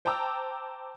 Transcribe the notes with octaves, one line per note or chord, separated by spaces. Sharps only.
C5 G5 A5 A#5 D6 E6